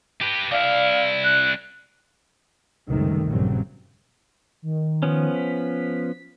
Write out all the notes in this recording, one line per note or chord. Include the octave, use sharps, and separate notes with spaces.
G4 B4
C2 E4 D5 E5 F5
F#6
C#2 F#2 C3 D#3 G3 A3
A#1 G2 C#3 F#3 G3 C4
D#3
F3 B3 C#4
B6